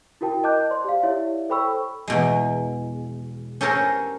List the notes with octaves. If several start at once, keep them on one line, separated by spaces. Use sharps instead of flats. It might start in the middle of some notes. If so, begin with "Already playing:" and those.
E4 F#4 A#4 G5 A5
D#5 A5 D6 F#6 G6
C5 D5 C6
G4 F5
E4 G4 C#5 D5 E5
A4 C5 G5 B5 C#6 E6
E2 B2 G#3
C#4 G4 A4 A#4 C5 C#5